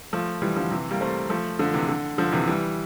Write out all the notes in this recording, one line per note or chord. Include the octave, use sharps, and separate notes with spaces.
F3 A3
E3 G3
D3 F3
C3 E3
G3 A#3
A3 C4
F3 A3
D3 F3
C3 E3
D3
D3 F3
C3 E3
E3 G3